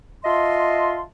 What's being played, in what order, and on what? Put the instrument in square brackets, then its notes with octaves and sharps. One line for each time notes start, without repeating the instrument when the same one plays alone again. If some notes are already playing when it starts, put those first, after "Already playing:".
[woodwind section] F4 D#5 E5 A5 C6